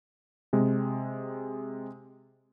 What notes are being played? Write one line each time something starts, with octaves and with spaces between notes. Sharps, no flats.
C3 G#3